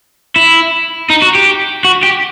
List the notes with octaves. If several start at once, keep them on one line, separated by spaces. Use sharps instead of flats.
E4
D#4
F#4
G4
F#4
G4